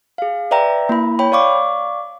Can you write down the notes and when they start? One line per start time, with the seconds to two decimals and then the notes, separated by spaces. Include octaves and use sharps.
0.18 G#4 F5
0.51 B4 D5 E5 G5 A#5
0.89 A#3 E4 B5
1.19 C#5 G5 B5
1.32 D5 F5 C#6 D6